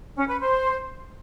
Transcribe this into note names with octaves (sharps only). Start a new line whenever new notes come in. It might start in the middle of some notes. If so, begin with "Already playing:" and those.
C#4
B4
C5